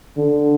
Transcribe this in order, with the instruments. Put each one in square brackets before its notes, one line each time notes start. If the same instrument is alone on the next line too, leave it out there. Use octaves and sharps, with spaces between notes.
[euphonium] D3